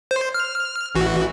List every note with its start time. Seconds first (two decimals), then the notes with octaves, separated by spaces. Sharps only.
0.11 C5
0.34 F6
0.95 A1 E3 F#4